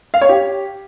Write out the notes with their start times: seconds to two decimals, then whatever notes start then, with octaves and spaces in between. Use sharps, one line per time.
0.14 F5
0.21 C#5
0.29 G4